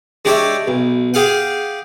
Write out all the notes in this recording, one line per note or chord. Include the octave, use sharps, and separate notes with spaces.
G#3 D4 G4 C#5 D5 E5
B1
G4 G#4 F5 F#5